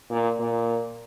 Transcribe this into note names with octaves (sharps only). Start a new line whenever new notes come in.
A#2
A#2